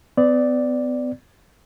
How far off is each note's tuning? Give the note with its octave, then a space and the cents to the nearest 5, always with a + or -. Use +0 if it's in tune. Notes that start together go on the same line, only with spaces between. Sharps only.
B3 +40 D5 +0